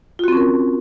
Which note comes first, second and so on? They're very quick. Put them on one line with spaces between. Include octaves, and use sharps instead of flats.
F4 F#4 C4 C#4 A#4